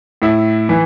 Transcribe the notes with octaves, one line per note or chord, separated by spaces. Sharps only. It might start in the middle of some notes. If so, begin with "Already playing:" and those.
A2 E4
E3